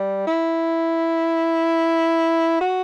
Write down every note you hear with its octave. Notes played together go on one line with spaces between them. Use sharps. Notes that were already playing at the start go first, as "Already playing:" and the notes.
Already playing: G3
E4
F#4